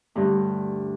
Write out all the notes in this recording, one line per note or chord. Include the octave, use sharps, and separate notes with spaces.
D2 G2